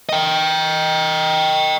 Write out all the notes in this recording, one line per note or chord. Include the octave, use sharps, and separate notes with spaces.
D#5 G5